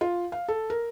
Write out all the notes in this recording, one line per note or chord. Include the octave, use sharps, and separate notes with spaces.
F4
F5
A4
A#4